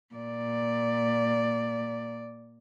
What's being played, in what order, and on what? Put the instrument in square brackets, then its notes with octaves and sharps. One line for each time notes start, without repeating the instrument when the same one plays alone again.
[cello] A#2 D5